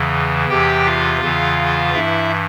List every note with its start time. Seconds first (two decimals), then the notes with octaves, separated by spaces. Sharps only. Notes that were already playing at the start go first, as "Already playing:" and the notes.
Already playing: E2 C#3 E3
0.49 E2 C3 E3 G4 G5
0.85 F4 F5
1.21 E2 C#3 E3
1.94 G2 E3 E4 E5